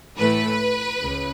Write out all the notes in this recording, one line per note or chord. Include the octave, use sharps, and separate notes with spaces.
A2 E3 A3 B4
C#2 C#3